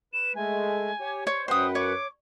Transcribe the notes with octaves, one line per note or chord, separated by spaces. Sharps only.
B4 E7
G#3 A3 G#5
G4 C#5
C5 C#5 C#6
F#2 B4 C5 F#5 G5 D#6
C#5 D6